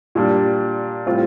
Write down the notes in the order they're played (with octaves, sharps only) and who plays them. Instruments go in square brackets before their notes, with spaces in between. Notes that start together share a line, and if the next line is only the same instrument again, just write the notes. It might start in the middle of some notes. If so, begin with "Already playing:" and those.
[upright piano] A#2 G3 D4
A2 G3 C4 F4